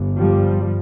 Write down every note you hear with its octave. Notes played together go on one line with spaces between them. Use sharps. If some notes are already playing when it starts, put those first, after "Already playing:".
Already playing: G1 G2
F3 G3